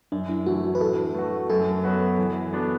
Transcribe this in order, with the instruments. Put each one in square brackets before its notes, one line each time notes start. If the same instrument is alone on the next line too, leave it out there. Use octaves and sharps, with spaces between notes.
[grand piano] F#2 [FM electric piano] D4
[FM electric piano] E4
[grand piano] E3 A3 [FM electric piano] F#4
[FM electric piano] F#4
B4
[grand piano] A2 [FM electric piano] A4
[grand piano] A3 F#4
[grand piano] F#2 [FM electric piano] A4
[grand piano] F#3 B3 F#4 B4
E3
B3 D4 F#4